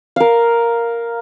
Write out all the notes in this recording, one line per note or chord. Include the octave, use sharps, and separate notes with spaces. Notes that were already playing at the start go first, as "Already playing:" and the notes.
A#4 F5